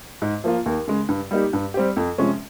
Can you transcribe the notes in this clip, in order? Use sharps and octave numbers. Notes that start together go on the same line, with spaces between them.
G#2
F3 A#3 F4
D#2
C#3 G#3
G2
G3 A#3 D#4 G4
G2
G3 C4 G4
F2
C3 F3 G#3 C#4